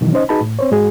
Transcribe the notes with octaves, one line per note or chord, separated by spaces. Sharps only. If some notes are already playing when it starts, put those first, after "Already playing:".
B2 D#3 E3 F#3
C#4 D#4 C5 D#5
D#4 F#4 G#4 B4 A5 B5
A2
C4 C5 C#5
G#2 G#3 F#4 G#4